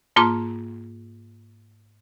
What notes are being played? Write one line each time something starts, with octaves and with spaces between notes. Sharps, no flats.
G#2 A#3 F4 A5 C6 D6